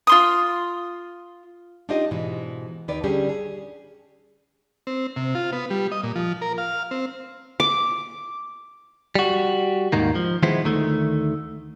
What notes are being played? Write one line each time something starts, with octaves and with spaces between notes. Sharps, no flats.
F4 C6 D#6
D4 D#4 F4 G4 D#5
G#2 B2 E3
D#2 D#3 B4 D5
D3 G3 C#4 D4 G4 G#4
G#4
C4
C3
F4
B3
G3
D#5
A#2
F3
A#4
F5
C4
D6
G3 F#4
D#2 G#2 D#3 A#3
F3
D#3 F3 G#3 B3 E4 C5
D2 D#3 A3